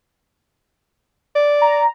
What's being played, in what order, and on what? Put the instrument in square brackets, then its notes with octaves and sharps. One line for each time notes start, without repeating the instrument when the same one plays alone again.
[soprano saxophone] D5
[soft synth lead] A#5